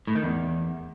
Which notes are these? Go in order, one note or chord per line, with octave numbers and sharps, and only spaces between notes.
A2
D#3
E2